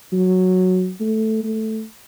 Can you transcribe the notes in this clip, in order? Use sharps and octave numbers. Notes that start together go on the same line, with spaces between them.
F#3
A3
A3